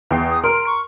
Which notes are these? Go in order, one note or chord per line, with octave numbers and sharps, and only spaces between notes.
E2 G5 C7
D#6
A#4 C6 F6 D7
C#6